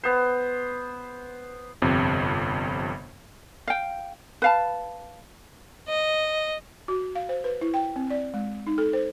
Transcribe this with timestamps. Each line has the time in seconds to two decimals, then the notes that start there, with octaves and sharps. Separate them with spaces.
0.03 B3 C5
1.82 G1 F2 C3
3.68 F5 G5
4.42 B4 F5 A5
5.89 D#5
6.88 F#4
7.15 F5
7.29 C5
7.44 B4
7.61 E4
7.74 G5
7.96 C4
8.10 D5
8.34 G#3
8.67 D#4
8.78 A4
8.93 C5